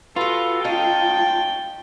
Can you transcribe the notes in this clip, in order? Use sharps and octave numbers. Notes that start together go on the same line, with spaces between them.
F4 F#4 A4 B4
C#4 D#4 G5 A5